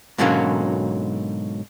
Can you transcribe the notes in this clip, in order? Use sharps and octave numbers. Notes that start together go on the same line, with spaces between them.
G#2 B2 D3 F#3 A#3 C#4